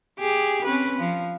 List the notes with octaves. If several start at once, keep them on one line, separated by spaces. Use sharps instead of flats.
G4 G#4
C4 C#4 B4
F3